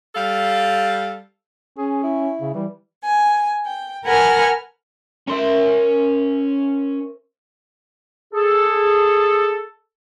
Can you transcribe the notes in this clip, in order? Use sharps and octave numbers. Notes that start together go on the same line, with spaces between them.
G3 A4 F5
C#4 G#4
E4
C#3
E3 G3
G#5
G5
A#4 B4 F#5 G#5 A5 F6
C#4 A#4 C5 E5 C6
G#4 A4